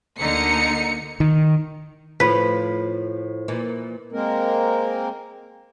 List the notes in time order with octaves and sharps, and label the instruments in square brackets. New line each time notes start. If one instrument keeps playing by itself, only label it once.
[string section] D2 D3 A#3 D#4 C#7
[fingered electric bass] D#3
[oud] A2 F3 F4 [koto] B4
[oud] A#2 E3
[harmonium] G#3 A#3 C4 A#4